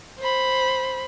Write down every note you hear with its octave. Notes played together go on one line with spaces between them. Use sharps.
C5 B5